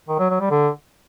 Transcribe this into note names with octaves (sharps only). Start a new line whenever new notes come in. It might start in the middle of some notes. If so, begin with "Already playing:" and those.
D#3
F#3
F#3
G3
D3